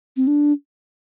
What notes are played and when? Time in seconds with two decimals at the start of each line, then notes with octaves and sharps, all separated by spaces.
0.17 C4
0.27 D4